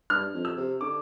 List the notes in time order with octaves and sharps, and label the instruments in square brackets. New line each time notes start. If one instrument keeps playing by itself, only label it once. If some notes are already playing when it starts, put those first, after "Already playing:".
[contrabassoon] G2 [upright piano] F6
[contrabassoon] F2
[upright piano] E6
[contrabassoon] C3
[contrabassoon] D3 [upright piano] D6